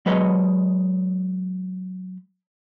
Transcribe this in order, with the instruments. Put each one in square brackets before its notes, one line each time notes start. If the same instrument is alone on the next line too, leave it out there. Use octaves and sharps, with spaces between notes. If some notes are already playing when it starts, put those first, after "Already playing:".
[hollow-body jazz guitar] F#3 G#3 B4 C#5 D#5